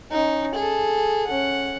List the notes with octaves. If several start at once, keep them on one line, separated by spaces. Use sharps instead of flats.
C#4 D#4
G#4 A4
C#4 F#5